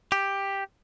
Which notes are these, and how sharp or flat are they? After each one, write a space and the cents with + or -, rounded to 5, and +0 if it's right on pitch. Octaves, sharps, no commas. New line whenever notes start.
G4 +5